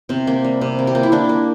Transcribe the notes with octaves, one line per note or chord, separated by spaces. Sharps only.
C3 C4
A#3
G3
C3
A#3
G4
A#3 F4
E4
A#3 D4
A#3